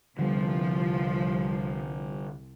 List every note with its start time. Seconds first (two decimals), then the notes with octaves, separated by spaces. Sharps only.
0.19 C2 D3 F3 G3